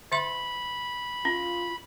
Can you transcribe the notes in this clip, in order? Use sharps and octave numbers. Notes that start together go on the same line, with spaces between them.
D3 E5 B5 C6
C#4 F4